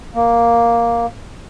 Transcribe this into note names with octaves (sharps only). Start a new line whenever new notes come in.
A#3